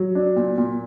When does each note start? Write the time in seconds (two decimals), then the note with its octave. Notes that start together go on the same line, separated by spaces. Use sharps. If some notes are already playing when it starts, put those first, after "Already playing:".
Already playing: F#3
0.15 D4
0.36 A#2
0.58 A#2